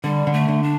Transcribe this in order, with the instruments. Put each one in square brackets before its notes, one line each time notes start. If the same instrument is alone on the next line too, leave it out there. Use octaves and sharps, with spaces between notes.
[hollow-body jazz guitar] D3 [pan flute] G3
[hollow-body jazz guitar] D3
[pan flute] A3
[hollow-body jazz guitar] D3
[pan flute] D4